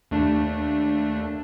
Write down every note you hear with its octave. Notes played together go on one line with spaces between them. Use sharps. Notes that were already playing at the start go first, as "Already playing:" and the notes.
D#2 A3 D4